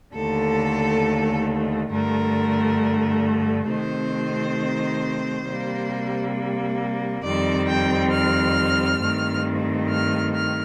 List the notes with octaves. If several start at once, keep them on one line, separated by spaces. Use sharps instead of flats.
D#2 D3 A3 A4
G2 D3 A3 A#4
C3 D#3 A3 C4 C5
C3 G3 A#3
F2 D#3 G3 C4 D5
G5
F6
G2 D#3 A3 C4
F6
F6